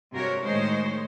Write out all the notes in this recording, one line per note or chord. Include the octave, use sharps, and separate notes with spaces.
G2 C3 G#3 F#4 A#4 C#5
A2 D#3 G#3 D#4 C5 C#5